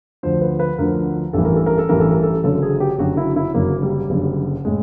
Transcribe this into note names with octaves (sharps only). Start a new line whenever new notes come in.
D2 D3 F3 C5
B4
B4
D2 D3 F3 A#4
A1 G2 E3 A4
A#4
A4
A#4
A4
A1 G2 E3 A#4
A4
A#4
A4
F#1 F#2 D3 F#3 A4
G#4
G4
F#1 F#2 D3 F#3 F#4
E4
E4
F#1 F#2 D3 F#3 A#3
G3
F#1 F#2 D3 F#3
A2 G#3